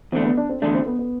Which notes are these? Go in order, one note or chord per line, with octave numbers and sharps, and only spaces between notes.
E2 D3 A3 C4
B3
D4
C4
E2 D3 A3 D4
C4
B3
B3